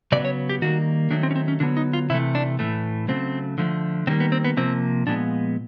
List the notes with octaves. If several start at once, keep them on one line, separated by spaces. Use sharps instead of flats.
C#3 F#3 B3 D5
C#5
G4
D#3 G3 A#3 F#4
D#3 F#3 A3 D4
C4
C#4
C4
C#4
D3 F#3 B3 D4
D#4
F4
C3 E3 A3 E4
D4
A2 E3 A3
C#3 F#3 A3 C4
D3 F3 A3
D#3 G3 A#3 C4
B3
C4
B3
C3 F3 A#3 C4
A#2 F3 G#3 B3 D4